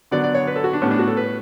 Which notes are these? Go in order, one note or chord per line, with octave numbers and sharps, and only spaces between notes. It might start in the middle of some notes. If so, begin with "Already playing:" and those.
D3 F#3 B3 D5
D5
C#5
B4
A4
F#4
D4
A2 G3 B3 C#4
D4
F#4
A4
B4